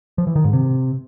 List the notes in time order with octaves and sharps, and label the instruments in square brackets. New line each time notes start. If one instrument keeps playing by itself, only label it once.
[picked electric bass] F3
E3
D#3
G#2
C3